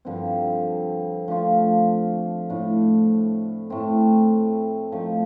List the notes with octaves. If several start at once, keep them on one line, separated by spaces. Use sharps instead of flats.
G2 D3 F3 C4
F3 A3 D4 F4
A2 A3 D4
A2 A3 C4
F3 A3 D#4